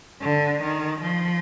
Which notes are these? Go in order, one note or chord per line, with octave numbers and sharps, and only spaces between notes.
D3
D#3
F3